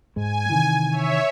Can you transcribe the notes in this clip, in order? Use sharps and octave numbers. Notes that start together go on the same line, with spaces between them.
G#2 G#3 G#5
C3 D#3 E3
C#5 E5